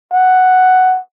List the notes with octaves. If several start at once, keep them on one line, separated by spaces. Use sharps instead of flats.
F#5